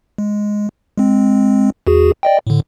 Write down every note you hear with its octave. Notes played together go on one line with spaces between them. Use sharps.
G#3
G#3 C4
E2 F#4 G#4
D5 D#5 G5
A2 D3